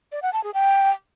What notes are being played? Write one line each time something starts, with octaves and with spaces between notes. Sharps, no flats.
D5
F#5
A5
G#4
G5